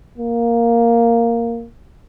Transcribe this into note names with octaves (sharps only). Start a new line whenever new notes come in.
A#3